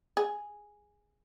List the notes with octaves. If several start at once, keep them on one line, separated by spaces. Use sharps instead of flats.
G#4